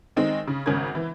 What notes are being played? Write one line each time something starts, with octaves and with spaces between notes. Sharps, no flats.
D#3 G#3 C4 D#4
C#3
G#1 C#3 C#4 A#4 G#6
E3